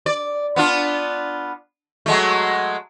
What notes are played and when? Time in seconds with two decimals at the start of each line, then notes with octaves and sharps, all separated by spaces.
0.06 D5
0.56 B3 D4 F4
2.06 F#3 G#3 A3